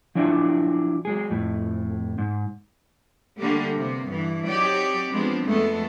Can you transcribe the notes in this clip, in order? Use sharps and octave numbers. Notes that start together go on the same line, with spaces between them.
F3 F#3 D4 E4 D5
F#3 G#3 G#4
F2 A2
G#2
D3 G3 A3 A#3 G4
C3 A#3 B3
G2 E3
F#3 C4 D#4 G4 C#5 D5
F3 G#3 B3 C4 D4
F2 G#3 A3 B3 A4